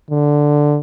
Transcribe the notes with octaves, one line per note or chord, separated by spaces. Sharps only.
D3